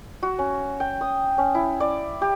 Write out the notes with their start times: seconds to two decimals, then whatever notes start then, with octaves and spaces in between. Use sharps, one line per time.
0.23 F#4
0.39 C#4
0.80 G5
1.01 D#6
1.38 C#4
1.55 E4
1.80 D5
2.21 G4